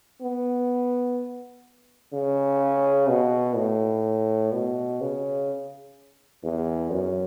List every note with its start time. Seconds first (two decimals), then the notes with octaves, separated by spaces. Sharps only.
0.22 B3
2.13 C#3
3.09 B2
3.57 A2
4.53 B2
5.01 C#3
6.44 E2
6.92 F#2